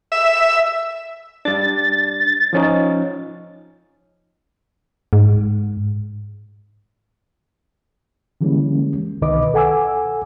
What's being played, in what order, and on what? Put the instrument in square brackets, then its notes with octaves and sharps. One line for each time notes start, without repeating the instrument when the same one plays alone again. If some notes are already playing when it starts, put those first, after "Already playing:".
[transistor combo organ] E5
[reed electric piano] G3 D4 [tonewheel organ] A6
[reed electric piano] F3 C#4 D#4
[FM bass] G#2
[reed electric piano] D3 E3 G3 G#3 A#3 C#4
C2 B2 D#3 B4 D#5 D6
A4 F#5 G#5 D6 E6